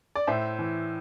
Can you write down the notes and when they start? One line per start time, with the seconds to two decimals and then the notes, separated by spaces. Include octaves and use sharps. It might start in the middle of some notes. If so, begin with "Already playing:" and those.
0.15 D5
0.27 A2 C5 E5
0.59 E3